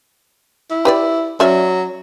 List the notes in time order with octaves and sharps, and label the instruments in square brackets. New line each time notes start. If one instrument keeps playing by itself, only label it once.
[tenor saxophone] E4
[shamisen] G4 B4 D5
[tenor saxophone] F#3 [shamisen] C#4 D5 E5